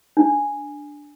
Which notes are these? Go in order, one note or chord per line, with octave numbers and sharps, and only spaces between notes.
D4